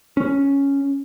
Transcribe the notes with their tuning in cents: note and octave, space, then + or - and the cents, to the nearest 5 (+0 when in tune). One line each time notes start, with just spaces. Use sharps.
C#4 +0